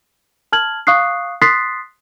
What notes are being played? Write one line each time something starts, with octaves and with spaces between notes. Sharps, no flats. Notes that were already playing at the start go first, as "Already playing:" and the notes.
A5 F6 G#6 F#7
F5 C#6 D#6 F#6 C7
C6 D#6 F#6 A6 B6 C7